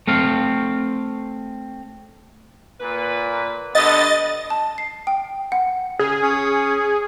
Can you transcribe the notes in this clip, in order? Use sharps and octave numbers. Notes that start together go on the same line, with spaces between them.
A3 C4 F5
A#2 B4
G2 D3 B3 D#5 A6
A5
C7
G5
F#5
C#3 G#4
C#4